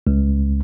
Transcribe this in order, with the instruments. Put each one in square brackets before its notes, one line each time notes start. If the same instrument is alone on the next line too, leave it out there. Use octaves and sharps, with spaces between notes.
[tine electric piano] C#2